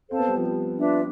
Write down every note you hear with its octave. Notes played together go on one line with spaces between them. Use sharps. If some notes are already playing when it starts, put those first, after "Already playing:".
C4 A4 C5 F5 A5
B3
G3
F3
G3
D4 F4 B4 E5